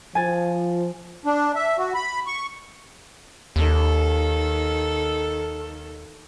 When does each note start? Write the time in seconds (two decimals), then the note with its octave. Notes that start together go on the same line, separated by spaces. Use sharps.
0.15 F3 G#5 A6
1.26 D4
1.55 E5
1.78 F#4
1.94 B5
2.27 C#6
3.56 D#2 D#3 A4